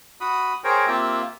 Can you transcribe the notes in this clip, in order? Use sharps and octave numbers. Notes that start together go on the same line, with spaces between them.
F#4 B5 D#6
G#4 A#4 C5 C#5 G5
A#3 C4 F4 G4 E5